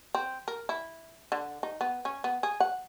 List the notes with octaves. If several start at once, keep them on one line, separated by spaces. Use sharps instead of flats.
C4
A#4
E4
D3
D#4
B3
C#4
B3
G#4
F#5